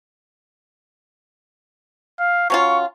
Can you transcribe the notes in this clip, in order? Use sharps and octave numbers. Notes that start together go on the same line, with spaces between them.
F5
F#3 C#4 F4 C#6